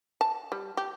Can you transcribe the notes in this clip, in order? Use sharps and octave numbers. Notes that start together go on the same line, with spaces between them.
A5
G3
G4